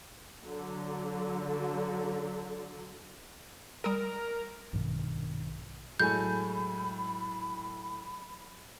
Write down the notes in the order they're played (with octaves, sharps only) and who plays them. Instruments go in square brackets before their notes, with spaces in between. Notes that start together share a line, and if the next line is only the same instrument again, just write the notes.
[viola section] D3 F#3
[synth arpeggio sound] G3 D#6 D7 [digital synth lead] A#4
[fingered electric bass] A#1 G2 B2 D#3
[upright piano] A2 A4 G#5 [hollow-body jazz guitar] F#3 G#3 [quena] B5 [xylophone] G6